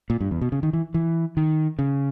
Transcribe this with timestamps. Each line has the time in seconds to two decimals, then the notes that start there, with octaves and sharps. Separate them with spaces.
0.10 A#2
0.20 G2
0.31 E2
0.41 B2
0.52 C#3
0.63 D#3
0.73 E3
0.94 E3
1.37 D#3
1.79 C#3